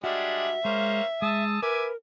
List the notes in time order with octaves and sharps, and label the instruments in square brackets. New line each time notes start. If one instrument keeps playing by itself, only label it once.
[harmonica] G3 G#3 D4 [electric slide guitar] F#4 [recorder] E5
[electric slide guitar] G#3 [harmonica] A#3 C#4 C5
[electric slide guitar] G#3 [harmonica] A5 D#6 E6
[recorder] A#4 [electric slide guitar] B4 [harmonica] E5 G#5 D6